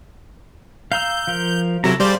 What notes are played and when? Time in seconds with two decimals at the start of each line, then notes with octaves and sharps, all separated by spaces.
0.92 F5 A#5 E6 G6
1.27 F3 A#4
1.84 C3 F#3 E4 A4 A#5
2.00 G3 G#4 A4 C5 D5 F5